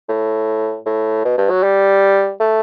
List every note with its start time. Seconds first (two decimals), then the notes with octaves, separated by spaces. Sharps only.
0.09 A2
0.86 A2
1.25 B2
1.38 G2
1.50 F#3
1.63 G3
2.40 A3